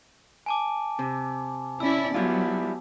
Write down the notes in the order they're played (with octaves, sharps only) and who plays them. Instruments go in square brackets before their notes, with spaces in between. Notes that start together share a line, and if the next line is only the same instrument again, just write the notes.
[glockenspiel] G#5 A5 D6
[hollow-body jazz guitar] C3
[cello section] C#4 E4 D5 [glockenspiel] E6
[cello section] F#3 B3 [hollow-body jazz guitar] G3 E4 F4